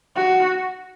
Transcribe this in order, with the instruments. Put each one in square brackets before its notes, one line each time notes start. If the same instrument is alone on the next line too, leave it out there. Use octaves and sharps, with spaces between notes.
[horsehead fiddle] F#4